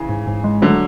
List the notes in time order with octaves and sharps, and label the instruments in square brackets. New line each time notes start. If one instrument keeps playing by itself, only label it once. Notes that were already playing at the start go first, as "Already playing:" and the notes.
Already playing: [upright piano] C#3 E3
[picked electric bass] G#2
G#2
G#3
[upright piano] D3 F#3 [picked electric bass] A3